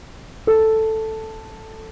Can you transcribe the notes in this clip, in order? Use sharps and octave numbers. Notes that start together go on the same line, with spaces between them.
A4